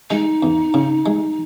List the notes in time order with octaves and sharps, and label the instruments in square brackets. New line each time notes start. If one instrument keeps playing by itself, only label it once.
[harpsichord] G#3 [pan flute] D#4
[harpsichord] E2
C#3
G#3